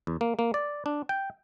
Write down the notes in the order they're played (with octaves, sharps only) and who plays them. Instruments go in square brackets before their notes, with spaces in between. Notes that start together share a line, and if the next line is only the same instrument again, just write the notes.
[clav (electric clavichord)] E2
A#3
A#3
D5
D4
G5